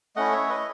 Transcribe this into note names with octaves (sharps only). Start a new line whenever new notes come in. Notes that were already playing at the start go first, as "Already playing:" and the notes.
A3 C#4 E4 D#5 F#5
C#5 E5
B4 D#5